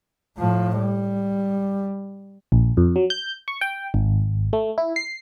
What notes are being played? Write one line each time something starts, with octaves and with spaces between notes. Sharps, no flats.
A2 F3
G3
A#1
F2
F#3
G6
C#6
G5
G#1
A3
E4
C7